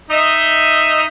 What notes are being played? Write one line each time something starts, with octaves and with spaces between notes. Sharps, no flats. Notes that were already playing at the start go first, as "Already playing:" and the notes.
D#4 D#5 E5